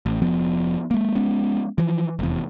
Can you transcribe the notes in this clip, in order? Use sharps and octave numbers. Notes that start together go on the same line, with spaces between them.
A1
F1 F3 B3
G#3 A#3
G#3 B3 C#4
E3 F3
F1 E2